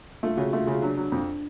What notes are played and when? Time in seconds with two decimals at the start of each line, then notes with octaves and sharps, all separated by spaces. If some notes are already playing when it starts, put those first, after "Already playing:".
0.23 A3 F4
0.37 C#3 F#4
0.53 A3 F4
0.67 C#3 F4
0.82 F#3 D4
0.98 F#3
1.12 F2